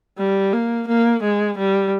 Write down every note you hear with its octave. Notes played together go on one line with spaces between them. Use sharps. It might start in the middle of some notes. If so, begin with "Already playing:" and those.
G3
A#3
A#3
G#3
G3